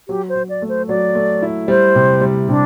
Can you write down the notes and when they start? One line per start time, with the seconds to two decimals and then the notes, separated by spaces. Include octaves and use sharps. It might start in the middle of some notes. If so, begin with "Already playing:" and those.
0.08 F#3 G4
0.29 C5
0.35 F#3
0.49 D5
0.62 A3
0.69 C5
0.88 F#3 D5
1.15 A3
1.42 E4
1.68 G3 C5
1.95 C3
2.21 G3
2.49 C3 D4